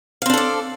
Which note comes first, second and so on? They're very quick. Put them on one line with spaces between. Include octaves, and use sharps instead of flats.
F5 C4 D4 A4 D5